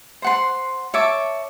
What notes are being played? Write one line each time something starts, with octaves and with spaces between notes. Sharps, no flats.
C5 F#5 C6
C#5 E5 A5 D6